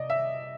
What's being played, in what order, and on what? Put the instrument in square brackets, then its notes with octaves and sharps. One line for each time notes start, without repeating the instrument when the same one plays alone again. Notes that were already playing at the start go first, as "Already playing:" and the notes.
Already playing: [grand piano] C3 D5 D#5
E5